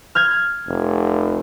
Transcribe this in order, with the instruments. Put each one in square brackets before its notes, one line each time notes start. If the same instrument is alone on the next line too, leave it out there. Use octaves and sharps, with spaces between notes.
[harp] F6 G6 G#6
[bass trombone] F1